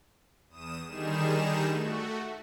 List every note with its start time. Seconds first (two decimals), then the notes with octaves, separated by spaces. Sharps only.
0.48 E2 D#6 E7
0.87 D3 D#3 G3 D#4 G#4 E7
1.66 A3 F#4